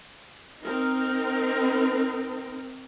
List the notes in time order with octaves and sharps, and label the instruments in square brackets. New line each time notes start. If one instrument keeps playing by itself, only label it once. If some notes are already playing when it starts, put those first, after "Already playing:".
[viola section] C4 D#4 A#4